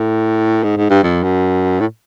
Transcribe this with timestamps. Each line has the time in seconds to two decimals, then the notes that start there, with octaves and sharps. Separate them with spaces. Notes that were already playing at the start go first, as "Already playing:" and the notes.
Already playing: A2
0.63 G#2
0.77 G#2
0.90 G2
1.03 F2
1.23 F#2
1.80 A2